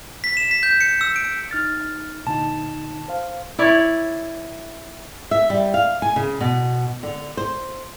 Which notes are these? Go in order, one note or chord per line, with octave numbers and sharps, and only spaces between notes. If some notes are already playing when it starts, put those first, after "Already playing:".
B6
E7
B6
G6
C#7
E6
D7
D#4 F6 A6
A#2 D3 D#4 A5
C5 F5
E4 C#5 D5
E5
G3
F5
G#5
C#3
B2
D3
C5